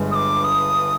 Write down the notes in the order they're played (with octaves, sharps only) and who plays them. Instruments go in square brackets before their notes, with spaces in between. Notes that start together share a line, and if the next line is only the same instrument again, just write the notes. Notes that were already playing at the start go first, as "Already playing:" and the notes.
Already playing: [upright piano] G1 G2 G#3
[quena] D#6
D6
D#6